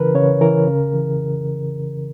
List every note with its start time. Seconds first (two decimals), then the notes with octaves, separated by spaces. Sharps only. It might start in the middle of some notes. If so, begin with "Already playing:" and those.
Already playing: C#3 E3 A#4 B4
0.15 C#3 C#5
0.41 E3 A#4
0.67 C#3
0.93 E3